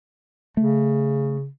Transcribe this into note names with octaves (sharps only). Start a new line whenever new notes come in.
C#3 A3